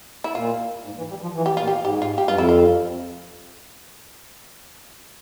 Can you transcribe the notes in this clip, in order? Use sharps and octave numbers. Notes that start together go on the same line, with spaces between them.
E4
A#2 F4
G#2
E3
G3
F3
E3
G4
A#2 F4
G4
G#2 G4
F4
G4
G2 F4
F2 E4
F4